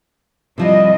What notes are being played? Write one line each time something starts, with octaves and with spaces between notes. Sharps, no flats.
C3 F3 G3 D4 E4 D#5